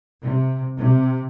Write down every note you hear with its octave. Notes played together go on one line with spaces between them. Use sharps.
C3
C3